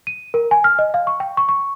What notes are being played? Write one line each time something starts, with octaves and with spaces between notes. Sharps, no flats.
D#7
A#4
G#5
F6
D#5
F5
C#6
G5
C#6
C#6